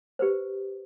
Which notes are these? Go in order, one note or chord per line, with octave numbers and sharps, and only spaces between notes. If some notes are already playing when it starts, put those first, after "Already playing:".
G4 B4 C5